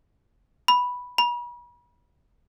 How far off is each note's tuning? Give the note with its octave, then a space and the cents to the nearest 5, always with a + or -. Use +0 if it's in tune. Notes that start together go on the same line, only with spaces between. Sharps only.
B5 -5
B5 -40